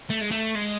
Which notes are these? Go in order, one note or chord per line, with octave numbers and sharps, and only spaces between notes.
A3
G#3
A3
G#3